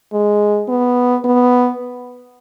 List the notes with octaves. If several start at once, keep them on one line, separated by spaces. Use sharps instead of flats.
G#3
B3
B3